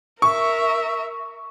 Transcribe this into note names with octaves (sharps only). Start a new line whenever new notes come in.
A#4 E5 C#6